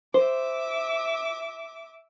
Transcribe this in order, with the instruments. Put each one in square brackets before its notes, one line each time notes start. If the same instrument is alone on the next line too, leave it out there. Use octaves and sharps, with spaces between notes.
[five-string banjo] C5 [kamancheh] E5 D6